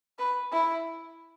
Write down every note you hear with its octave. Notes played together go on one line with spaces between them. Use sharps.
B4
E4